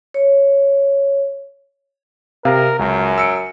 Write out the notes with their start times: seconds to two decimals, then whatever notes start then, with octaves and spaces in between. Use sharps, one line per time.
0.14 C#5
2.45 C3 A#4 F5
2.79 C#2 F#2
3.18 E6 C#7 D7